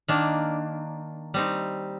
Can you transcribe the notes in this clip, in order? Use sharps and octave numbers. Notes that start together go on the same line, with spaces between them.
D#3 A#3 D4
G3 C4 D#4